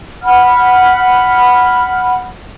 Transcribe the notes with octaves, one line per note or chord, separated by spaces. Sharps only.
F#5 B5 F6